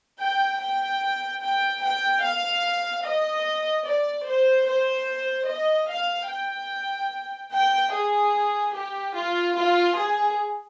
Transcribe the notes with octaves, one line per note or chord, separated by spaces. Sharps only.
G5
G5
G5
G5
F5
D#5
D5
C5
C5
D#5
F5
G5
G5
G#4
G4
F4
F4
G#4